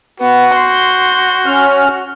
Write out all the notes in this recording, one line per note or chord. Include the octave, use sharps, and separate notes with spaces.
B3 F#4
C6 G6
C#4 F6